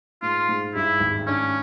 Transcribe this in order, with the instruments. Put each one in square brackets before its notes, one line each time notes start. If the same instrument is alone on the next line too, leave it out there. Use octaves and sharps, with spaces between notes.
[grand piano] G#2 [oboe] F4
[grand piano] G#2
[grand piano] G2 [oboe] E4
[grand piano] G#1
[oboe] C#4 [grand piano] D4